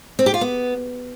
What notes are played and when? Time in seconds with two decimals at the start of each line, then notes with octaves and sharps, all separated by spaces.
0.19 C4
0.26 G4
0.34 F4
0.41 B3